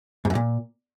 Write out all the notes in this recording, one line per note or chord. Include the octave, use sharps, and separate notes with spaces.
G#2
F#2
A#2